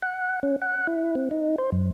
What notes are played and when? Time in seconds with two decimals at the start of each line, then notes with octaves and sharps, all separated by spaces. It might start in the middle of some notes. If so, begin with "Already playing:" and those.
0.02 F#5
0.43 C#4
0.62 F#5
0.87 E4
1.15 C4
1.31 D#4
1.58 C5
1.72 F#2